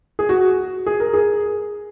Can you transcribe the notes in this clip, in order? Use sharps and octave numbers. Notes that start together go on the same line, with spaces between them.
G#4
F#4
G#4
A#4
G#4